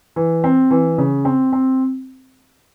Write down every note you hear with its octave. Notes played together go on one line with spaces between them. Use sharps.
E3
C4
E3
C#3
C4
C4